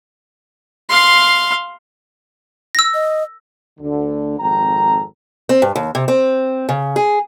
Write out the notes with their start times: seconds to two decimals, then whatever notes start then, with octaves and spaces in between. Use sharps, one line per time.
0.90 F5 C6
2.75 E6 A#6
2.94 D#5
3.80 D2 D3
4.40 G#1 F2 A4 G5 A#5
5.49 C4
5.62 G2
5.76 D#2
5.95 C3
6.08 C4
6.69 C#3
6.96 G#4